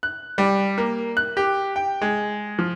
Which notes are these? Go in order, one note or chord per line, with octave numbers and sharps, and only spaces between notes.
F#6
G3
A#3
F#6
G4
G5
G#3
F3